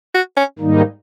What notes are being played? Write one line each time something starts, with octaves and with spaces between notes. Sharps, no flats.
F#4
C#4
G#2 D#3 G3 A#3 D#4